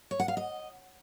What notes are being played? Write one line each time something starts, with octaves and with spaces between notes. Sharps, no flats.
C#5
F#5
F5
D#5